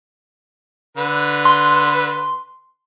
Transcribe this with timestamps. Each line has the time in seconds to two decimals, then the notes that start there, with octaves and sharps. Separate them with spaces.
0.97 D3 B4
1.45 C6